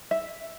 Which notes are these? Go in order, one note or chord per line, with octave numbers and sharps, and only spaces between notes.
E5